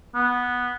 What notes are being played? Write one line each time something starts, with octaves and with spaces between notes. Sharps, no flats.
B3